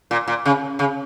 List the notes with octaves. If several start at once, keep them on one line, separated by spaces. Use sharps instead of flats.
A#2
A#2
C#3
C#3